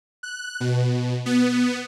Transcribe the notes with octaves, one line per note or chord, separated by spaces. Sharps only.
F#6
B2
B3